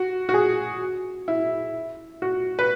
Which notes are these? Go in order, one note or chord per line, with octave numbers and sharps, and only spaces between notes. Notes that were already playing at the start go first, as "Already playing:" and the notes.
Already playing: F#4
F#4
G#4
E4
F#4
B4